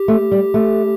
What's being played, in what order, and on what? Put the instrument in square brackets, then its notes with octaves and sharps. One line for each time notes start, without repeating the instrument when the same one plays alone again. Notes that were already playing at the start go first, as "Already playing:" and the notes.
Already playing: [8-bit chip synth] G4
[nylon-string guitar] A3
G3
A3